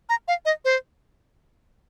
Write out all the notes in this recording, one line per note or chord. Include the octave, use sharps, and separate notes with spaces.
A#5
F5
D#5
C5